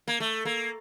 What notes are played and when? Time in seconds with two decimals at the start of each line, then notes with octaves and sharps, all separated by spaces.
0.08 A#3
0.20 A3
0.45 A#3